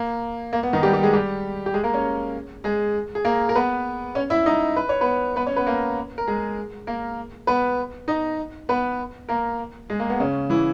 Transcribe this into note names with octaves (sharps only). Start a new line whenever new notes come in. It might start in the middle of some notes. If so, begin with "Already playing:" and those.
Already playing: A#3
A#3
B3
D#3 D#4
G3 G4
G3 G4
G#3 G#4
G3 G4
G4
G#3 G#4
A#3 A#4
C#4 C#5
G#3 G#4
G#4
A#3 A#4
A#4
B3 B4
C#4 C#5
E4 E5
D#4 D#5
B4
C#5
B3 B4
B3 B4
C#4 C#5
B3 B4
A#3 A#4
A#4
G#3 G#4
A#3 A#4
B3 B4
D#4 D#5
B3 B4
A#3 A#4
G#3 G#4
A#3
B3
C#3 C#4
E3 E4